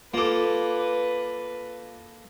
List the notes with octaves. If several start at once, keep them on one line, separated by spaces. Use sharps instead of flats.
A#3 F4 A4 B4 D6